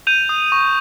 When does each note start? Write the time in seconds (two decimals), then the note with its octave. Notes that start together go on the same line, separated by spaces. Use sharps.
0.07 G6 D#7 F7
0.29 D#6
0.52 C#6